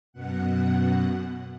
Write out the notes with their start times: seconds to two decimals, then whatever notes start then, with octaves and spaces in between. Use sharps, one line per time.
0.13 F#2 B2 F#5